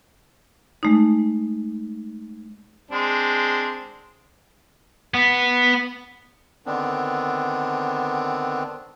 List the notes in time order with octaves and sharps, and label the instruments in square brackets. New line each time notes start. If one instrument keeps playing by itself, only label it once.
[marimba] G#3 A3 D#4
[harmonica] G#3 C4 D4
[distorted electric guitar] B3
[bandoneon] D3 D#3 B3 C4 D4